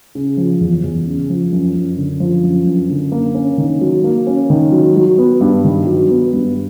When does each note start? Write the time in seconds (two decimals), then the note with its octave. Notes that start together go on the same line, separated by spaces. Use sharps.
0.15 C#3
0.37 F3
0.61 E2
0.84 E2
1.06 C#3
1.29 F3
1.52 F#2
1.75 F#2
1.97 D3
2.20 F3
2.43 F#2
2.67 F#2
2.90 D3
3.12 A#3
3.35 C#4
3.58 D#3
3.81 F#3
4.04 A#3
4.27 C#4
4.50 D#3
4.72 F#3
4.96 F#3
5.18 B3
5.41 G2
5.64 D#3
5.87 F#3
6.10 B3
6.33 G2